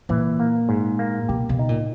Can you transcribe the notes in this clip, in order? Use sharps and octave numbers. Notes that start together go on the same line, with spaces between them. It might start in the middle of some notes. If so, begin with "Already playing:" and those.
A#2 E3
A#3
G#2
A#3
B2 G4
B2
D#4
A#2